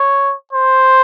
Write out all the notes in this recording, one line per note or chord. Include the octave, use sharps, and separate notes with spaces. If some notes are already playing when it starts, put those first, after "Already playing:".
Already playing: C#5
C5